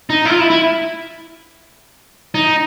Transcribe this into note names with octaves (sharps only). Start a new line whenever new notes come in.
D#4
E4
F4
E4
E4
D#4